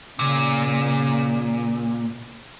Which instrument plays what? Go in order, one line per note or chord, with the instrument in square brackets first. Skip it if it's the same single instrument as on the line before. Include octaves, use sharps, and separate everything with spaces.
[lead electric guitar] A#2 [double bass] C#3